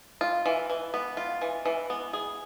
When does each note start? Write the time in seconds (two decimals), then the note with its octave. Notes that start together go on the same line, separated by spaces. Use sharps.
0.21 F4
0.46 E3
0.70 E3
0.94 B3
1.17 F4
1.41 E3
1.65 E3
1.90 B3
2.13 G#4